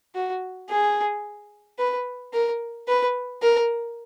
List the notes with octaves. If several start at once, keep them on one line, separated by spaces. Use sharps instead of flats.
F#4
G#4
B4
A#4
B4
A#4